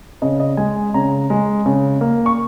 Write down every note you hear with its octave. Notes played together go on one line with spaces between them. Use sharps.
C#3 D#5
D#5
G#3 G#5
C#3 A#5
G#3
C#3
A#3
C#6